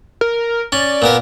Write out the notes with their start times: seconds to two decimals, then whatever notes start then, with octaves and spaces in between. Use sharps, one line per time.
0.21 A#4
0.72 C#4 D5
1.02 A#2 B3 A#4